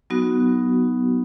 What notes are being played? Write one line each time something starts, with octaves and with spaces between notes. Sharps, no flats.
F#3 B3 D#4 F#4